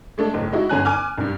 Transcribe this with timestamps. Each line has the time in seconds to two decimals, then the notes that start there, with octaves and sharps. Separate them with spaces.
0.18 G#3 A3 D4 A4
0.34 F#1 A2
0.52 G#3 D#4 E4 F#4
0.69 G1 D3 C#4 G#5 A#5 F#6
0.85 G#5 D6 F6
1.18 C2 G2